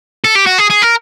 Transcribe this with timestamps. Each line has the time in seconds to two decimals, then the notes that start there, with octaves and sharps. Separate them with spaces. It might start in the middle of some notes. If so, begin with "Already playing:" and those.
0.24 A4
0.35 G4
0.47 F#4
0.59 G#4
0.71 G#4
0.83 A#4